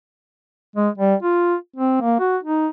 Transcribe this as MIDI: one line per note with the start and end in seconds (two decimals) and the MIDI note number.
0.76 0.89 56
0.98 1.15 55
1.22 1.55 65
1.76 1.98 60
2.01 2.17 58
2.20 2.37 66
2.43 2.68 63